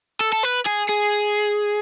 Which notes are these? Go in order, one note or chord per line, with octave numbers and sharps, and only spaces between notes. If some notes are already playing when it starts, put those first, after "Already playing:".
A4
A4
B4
G#4
G#4